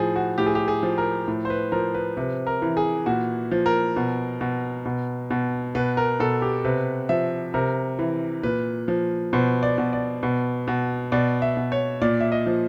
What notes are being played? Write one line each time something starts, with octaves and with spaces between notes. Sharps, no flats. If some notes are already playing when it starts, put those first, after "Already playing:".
Already playing: A2 F3 G#4
F#4
A2 G4
G#4
G4
G#4
F3
A#4
A2
C5
B4
F3 A#4
B4
C3 B4
A#4
E3
G#4
A#2 F#4
F3
A#4
B2
B2
B2
B2
B2 B4
A#4
B2 A4
G4
C3 B4
F3 E5
C3 A#4
E3
A#2 B4
F3
B2 C5
D5
B2
D5
B2
B2
B2 D5
E5
B2
C#5
A#2 D5
E5
D#5
F3